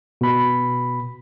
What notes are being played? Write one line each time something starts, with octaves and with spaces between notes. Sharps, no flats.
B2 B5